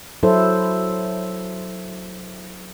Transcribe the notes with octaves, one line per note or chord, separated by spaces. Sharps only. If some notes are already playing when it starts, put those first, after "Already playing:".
F#3 E4 A4 C5